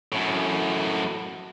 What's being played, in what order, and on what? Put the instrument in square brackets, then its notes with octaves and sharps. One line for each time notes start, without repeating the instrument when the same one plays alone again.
[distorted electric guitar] F#2 A2